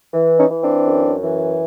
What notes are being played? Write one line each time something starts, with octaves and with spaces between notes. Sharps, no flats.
E3
C#4 D#4
E3
C4 D4
F#2
E3